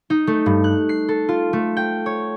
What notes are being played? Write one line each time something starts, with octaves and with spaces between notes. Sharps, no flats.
D#4
A3
G2
F#6
C7
A4
F4
A3
G5
C#5